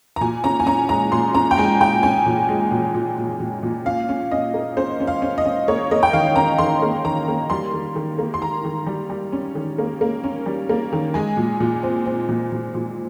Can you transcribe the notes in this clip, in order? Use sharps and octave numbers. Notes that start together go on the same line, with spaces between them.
A#5
A#2 G#5
C#4 A#5
G#5
C#4 A#5
G#3 A#5
A#2 C6
C#4 A#5
G5
G#3 G#5
G#3 G5
C#4 G#5
A#2
G#3
A#2
A#2
A#2
A#2
A#2
C#4 F5
C#4
C#4 D#5
A#3
C#4 C5
C#4
F5
C#4
D#5
C#4
A#3 C#5
A#3 D#5
G5
D#3 F5
C#4 A#5
D#3 C6
A#3
D#3 A#5
A#3
G3 C6
D#3
D#3
A#3
C6
D#3 A#5
D#3
G3
G3
C#4
D#3
A#3
A#3
C#4
G3
A#3
D#3
G#3 G#5
A#2
A#2
C4
C4
A#2
A#2
A#2